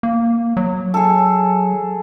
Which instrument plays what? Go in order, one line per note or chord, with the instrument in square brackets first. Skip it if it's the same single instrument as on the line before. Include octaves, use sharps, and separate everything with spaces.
[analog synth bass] A#3
F#3
[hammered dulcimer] G#4 A4